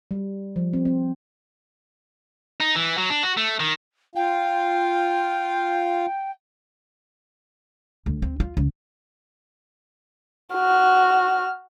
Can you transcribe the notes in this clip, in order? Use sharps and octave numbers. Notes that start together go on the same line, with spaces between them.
G3
F3
C4
C4
D#4
E3
F#3
D4
F#4
A3
D#3
F4 F5 G5
D2
C4
F4
C#2
F#4 F6